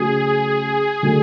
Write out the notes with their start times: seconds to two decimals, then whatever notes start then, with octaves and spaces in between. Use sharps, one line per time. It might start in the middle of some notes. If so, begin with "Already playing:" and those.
Already playing: C#3 F#3 A3 C#4 G#4
1.03 D3 F#3 A3